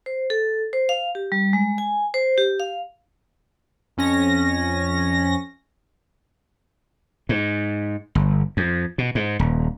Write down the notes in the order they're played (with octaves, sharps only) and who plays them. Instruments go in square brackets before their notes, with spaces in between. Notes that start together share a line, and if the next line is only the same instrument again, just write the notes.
[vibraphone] C5
A4
C5
F5
G4
G3
G#3
G#5
C5
G4
F5
[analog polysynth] F2 C#4 A#6
[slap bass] G#2
G1
F2
B2
G#2
D#1